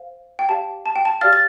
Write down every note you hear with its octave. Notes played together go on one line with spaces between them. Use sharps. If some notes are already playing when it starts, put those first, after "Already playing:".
Already playing: C5 F5
G5
G4 D5 F5 A5
A5
G5
A5
G4 D5 F5 F6 A6
A6